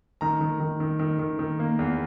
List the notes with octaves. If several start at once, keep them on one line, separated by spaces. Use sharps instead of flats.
D#3 A#5
D#3
D#3
D#3
D#3
D#3
D#3
A#3
E2